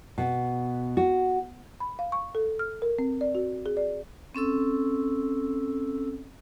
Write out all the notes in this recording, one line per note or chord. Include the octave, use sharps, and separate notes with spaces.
B2
F#4
B5
F5
C#6
A4
F6
A#4
C4
D5
F#4
G#4
D5
C4 C#4 A4 E6